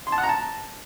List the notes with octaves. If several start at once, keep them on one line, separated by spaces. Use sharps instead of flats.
C6
A5
F#5
A#5
A5